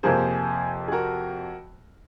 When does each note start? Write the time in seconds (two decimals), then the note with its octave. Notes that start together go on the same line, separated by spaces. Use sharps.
0.03 F2 C3 F3 A#3 G#4 C5
0.88 G#4
0.92 F#4 A#4